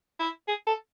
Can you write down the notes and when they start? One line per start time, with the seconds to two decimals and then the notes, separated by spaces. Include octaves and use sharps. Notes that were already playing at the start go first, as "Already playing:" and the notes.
0.20 E4
0.48 G#4
0.67 A4